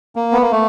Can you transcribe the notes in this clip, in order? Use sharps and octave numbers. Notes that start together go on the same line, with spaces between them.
A#3
B3
A#3
A3